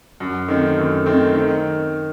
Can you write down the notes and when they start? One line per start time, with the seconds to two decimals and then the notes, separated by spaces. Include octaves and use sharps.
0.20 F#2
0.48 D#3 A3 C4
0.78 F#2
1.06 D#3 A3 C4
1.35 D#3